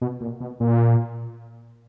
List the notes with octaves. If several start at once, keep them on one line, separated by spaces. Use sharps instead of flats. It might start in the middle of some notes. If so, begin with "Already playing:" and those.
B2
A#2
B2
A#2